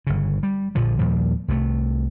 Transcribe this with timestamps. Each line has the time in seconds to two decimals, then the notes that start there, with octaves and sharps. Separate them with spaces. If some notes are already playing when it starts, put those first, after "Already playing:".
0.07 G1 C#3
0.43 G3
0.75 A#1 A#2 D3 F3
0.99 D#2 A#2 F3 G3
1.48 C2 C3 A3